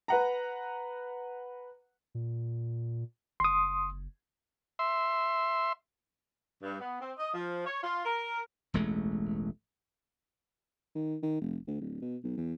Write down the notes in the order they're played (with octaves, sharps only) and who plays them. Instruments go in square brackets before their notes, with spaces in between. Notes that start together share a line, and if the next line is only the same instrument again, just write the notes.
[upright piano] B4 F#5 A#5
[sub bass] A#2
[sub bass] F#1 [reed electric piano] C6 D#6
[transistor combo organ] E5 C6
[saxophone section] G2
B3
C4
D#5
F3
C#5
F4
A#4
[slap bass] E1 A1 G#3 A3
[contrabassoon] D#3
D#3
F1
D2
D1
B2
B1
E2